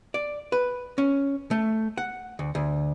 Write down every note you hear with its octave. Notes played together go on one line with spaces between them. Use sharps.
D5
B4
C#4
A3
F#5
D2
D2